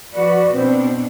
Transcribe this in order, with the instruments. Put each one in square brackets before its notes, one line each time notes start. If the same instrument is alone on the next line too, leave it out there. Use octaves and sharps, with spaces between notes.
[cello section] F3 F#4 B4 [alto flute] D5
[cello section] B2 D4 [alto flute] C4